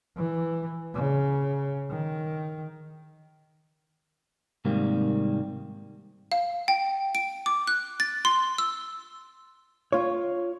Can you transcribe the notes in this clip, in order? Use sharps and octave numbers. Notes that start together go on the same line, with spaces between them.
E3
C#3
D#3
G#2 C3 D#3 G3 A#3 C4
F5
G5
D7
D6
F#6
A6
C6
E6
F4 C#5